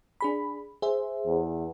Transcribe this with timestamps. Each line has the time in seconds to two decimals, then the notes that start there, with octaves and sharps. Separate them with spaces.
0.21 D4 G#4 B5
0.82 G#4 C5 E5
1.26 E2